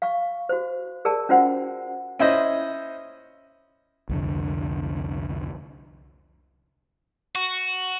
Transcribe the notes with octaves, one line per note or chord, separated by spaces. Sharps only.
F5 C#6
F#4 C5
G#4 A#4 D5 A5
C#4 F4 F#4 C5 F#5
C#4 E4 C5 D#5
C2 F2 D3
F#4